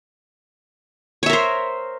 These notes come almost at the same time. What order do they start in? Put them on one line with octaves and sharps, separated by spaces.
C#5 E5 A#4 C5